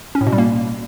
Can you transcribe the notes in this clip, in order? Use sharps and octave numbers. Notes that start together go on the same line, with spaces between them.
C#4
A2
B2
G3
A#3